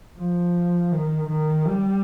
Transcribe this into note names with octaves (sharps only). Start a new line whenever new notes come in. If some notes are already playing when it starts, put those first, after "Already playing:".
F3
D#3
D#3
G3